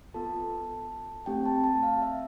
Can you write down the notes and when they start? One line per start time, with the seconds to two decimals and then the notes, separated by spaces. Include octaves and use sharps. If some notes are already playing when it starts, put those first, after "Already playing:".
0.14 B3 F4 A4 A5
1.26 A3 C4 G4 G5
1.46 A5
1.64 A5
1.83 F5
2.02 E5